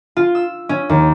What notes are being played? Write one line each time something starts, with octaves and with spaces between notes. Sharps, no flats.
F4
E6
C#4
D#2